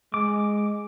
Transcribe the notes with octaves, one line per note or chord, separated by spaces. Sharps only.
G#3 D6